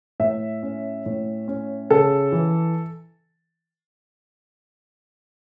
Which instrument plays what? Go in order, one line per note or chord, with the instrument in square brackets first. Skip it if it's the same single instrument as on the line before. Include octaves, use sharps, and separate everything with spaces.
[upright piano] A2 E5
C#4
A2
C#4
C#3 A4
E3